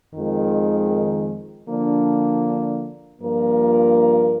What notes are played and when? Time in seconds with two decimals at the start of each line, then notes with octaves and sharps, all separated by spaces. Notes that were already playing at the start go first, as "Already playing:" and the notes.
0.13 F2 D#3 G#3
1.67 D3 F3 A#3 D4
3.20 G2 F3 A#3 F4 A#4